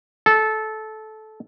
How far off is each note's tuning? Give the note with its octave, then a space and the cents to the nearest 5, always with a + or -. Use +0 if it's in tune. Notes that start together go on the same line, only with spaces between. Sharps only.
A4 -15